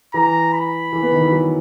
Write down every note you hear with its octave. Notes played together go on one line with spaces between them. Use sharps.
E3 A#5
B5
E3
B3
D#3
E3
F#3